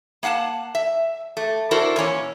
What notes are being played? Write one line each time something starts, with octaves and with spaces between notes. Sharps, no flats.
A#3 F5 F#5 G#5 A5
E5
A3
D4 E4 F#4 A4 A#4 C5
A#2 E3 C#4 C#5